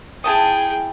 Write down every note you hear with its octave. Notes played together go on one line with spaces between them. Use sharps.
E4 G#4 G5 A5 D#6